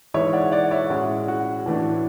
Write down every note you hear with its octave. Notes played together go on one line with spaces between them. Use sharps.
G#2 E3 G#3 C#5 E5
D5 F#5
D5 F#5
C#5 E5
A2 G#3 C#4 F#4
F#4
A2 E3 A3 D4